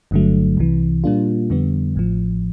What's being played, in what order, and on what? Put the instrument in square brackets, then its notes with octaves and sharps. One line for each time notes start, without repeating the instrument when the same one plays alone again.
[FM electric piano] G1 G2 D3 F#3 A3
C2 C3 E3
A#2 G3 A#3 D4 F4
F2 D3 G3 B3
A1 A2 F3